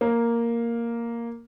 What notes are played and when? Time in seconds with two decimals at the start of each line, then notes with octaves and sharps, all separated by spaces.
0.01 A#3